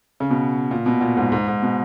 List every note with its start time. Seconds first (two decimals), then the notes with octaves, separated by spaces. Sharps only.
0.20 C#3
0.30 B2
0.71 A#2
0.86 B2
1.01 A#2
1.17 G#2
1.32 G#2
1.48 G#2
1.62 B2